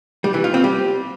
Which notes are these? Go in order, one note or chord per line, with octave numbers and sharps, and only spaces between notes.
G3
E3
F4
C4
G3